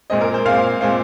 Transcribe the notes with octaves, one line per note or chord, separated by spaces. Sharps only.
A#2 G#3 C4 D#5
A#4
C5
A#2 G#3 C4 F5
A#2 G#3 C4 F5